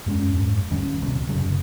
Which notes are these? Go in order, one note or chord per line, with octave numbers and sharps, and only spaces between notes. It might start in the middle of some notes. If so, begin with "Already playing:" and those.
F#2 G#3 B3 C#4
F2 G#2
D2 D#3 G3 C#4
C2 B2
F1 F#2 C#3 F#3